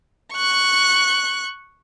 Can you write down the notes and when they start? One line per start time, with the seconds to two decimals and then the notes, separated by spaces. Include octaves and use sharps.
0.33 C#6 F#6